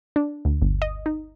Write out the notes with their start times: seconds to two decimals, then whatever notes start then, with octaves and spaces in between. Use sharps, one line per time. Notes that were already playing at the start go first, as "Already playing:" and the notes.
0.16 D4
0.45 D2
0.62 G1
0.82 D#5
1.06 D#4